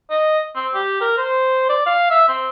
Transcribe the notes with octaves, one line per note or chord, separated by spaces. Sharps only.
D#5
C4
G4
A#4
C5
D5
F5
E5
C4